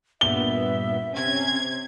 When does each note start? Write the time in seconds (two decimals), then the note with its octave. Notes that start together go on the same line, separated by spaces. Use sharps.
0.21 G2 A#2 B3 E5 G7
1.12 C3 C#4 G#6